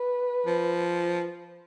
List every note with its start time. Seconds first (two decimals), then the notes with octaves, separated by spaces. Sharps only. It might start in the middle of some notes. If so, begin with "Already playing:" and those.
Already playing: B4
0.46 F3